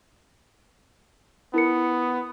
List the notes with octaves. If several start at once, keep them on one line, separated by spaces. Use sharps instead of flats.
B3 E4 A#4 C#7